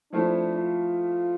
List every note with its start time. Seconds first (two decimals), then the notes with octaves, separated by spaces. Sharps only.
0.11 F3 A3 C4 D4 E4
0.56 F4